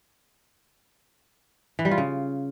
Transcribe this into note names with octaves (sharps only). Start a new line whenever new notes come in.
E3
G3
F4
C#3